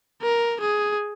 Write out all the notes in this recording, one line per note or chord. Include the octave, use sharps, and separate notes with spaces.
A#4
G#4